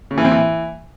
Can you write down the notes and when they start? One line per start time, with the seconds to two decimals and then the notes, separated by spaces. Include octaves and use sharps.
0.11 C#3
0.18 E3
0.25 C4
0.32 E3